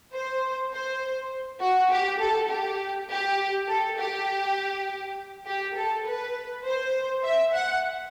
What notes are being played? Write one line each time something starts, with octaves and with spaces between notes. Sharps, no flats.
C5
C5
F#4
G4
A4
G4
G4
A4
G4
G4
A4
B4
C5
E5
F#5